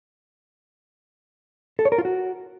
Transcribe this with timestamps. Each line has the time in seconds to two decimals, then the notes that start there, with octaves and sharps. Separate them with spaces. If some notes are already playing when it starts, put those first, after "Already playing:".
1.79 A4
1.85 C#5
1.92 A#4
1.98 F4
2.05 F#4